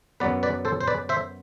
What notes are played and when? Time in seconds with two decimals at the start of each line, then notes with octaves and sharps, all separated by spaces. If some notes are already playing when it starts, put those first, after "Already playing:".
0.20 F#2 F#3 B3 B4 D5
0.43 B4 D5
0.65 A4 C5
0.80 C5
0.87 B4 D5
1.09 C5 E5